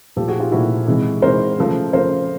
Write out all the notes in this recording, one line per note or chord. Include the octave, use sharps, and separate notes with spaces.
A#2 F3 A3 G4 A4
F#4 G#4
F4 G4
A#2 F3 A3 E4 F#4
C3 E3 G#3
C3 E3 G#3 A#4 C5
C#3 F3 A3
C#3 F3 A3 A#4 C5